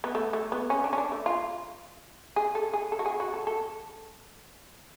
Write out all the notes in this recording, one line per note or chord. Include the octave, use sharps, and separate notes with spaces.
B3
A3
A3
B3
C#4
D4
C#4
D4
A3
F4
G#4
A4
G#4
A4
F#4
G#4
F#4
A4
A4